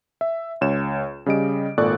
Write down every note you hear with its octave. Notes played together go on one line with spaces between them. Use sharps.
E5
C#2 C#5 E7
C#3 G3 D#5 D7
G#1 A#2 A4 D5 C#6 F#6